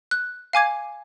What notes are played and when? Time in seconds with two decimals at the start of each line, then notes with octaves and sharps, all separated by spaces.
0.11 F#6
0.53 F5 G#5 D6 G#6